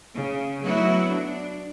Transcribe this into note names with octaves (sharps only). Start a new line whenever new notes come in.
C#3
F#3 A3 B3 E4 F#4
D4